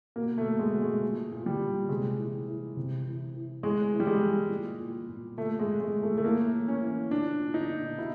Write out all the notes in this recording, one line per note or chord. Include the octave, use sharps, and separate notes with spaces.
B2 A#3
A3
B2
G#3
B2
G#3
A#2
A#2
G3
A#2
C3 G#3
E3
E3
C3
E3
E3
A2 G#3
E3
G3
G#3
E3
A#2
A#2
A#2
A#2 A3
G#3
A#2
G#3
A#2
A3
A3
A2 A#3
E3
C#4
E3
A#2 D4
A#2
D#4
A#2
B2 E4